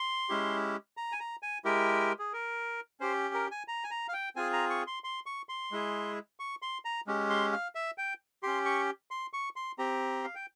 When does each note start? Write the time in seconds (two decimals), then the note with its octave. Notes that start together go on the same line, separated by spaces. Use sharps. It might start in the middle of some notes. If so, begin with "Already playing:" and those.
Already playing: C6
0.29 G#3 C#4 E4 G4
0.97 A#5
1.12 G#5
1.20 A#5
1.43 G#5
1.65 G#3 E4 G4 A#4
2.19 G#4
2.33 A#4
3.00 C#4 G4 C5
3.34 A#4
3.51 G#5
3.68 A#5
3.84 G#5
3.91 A#5
4.08 F5
4.13 G5
4.36 C4 F4 G#4 G#5
4.53 A#5
4.70 C#6
4.87 C6
5.04 C6
5.26 C#6
5.49 C6
5.72 G#3 E4 G#4
6.40 C#6
6.62 C6
6.85 A#5
7.07 G#3 C#4 G4
7.30 C6
7.52 F5
7.75 E5
7.98 G5
8.43 C#4 G4 C6
8.65 C#6
9.11 C6
9.33 C#6
9.56 C6
9.78 C4 G4 A#5
10.24 F5
10.35 G5